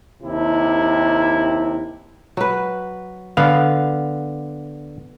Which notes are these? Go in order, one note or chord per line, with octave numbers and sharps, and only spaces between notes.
D#2 C3 E4
F#3 B4
D3 B3 F5